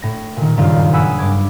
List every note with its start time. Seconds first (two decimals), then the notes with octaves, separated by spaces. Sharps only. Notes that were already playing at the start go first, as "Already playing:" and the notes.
0.02 A2 A#6
0.37 A#2 D#3
0.57 F#1 G2 D#3 F4 D5 F5
0.93 F#5 G#5 B5 D#6 E6
1.18 G2 D6 G#6